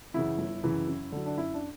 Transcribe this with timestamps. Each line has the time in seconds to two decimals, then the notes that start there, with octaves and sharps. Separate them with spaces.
0.14 F#2 C#3 E3 E4
0.38 G1
0.63 F#2 C#3 E3
0.87 F#2
1.12 D3 F#3
1.26 D4
1.38 F#2 E4
1.54 D4